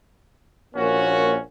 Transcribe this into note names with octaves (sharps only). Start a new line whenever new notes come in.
A#1 A#3 C#4 F#4